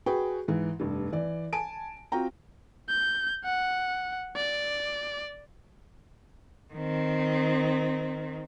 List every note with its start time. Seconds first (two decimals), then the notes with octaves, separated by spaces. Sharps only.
0.06 F#4 G#4 B4 G5
0.48 G#2 E3
0.79 F1 G2
1.12 E3 D5
1.53 G#5 A5 D7
2.12 C4 F4 F#4 G5 A#5
2.89 G6
3.45 F#5
4.36 D5
6.74 D#3 C4